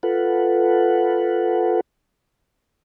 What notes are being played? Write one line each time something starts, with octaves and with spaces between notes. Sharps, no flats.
F4 A4 B4 F#5